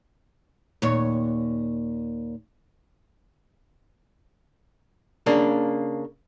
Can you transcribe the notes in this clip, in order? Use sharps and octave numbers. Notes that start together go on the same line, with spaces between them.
D#2 A#2 C#5
C#3 A#3 D4